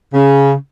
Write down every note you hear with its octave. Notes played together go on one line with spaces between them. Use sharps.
C#3